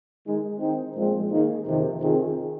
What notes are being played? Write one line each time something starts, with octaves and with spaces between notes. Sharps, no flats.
D#3 G#3 D#4
D#3 C4 D#4
A#2 F3 G#3 C4
D#3 A#3 D#4 G#4
F2 C3 D#3
C3 D#3 C4 F4 G#4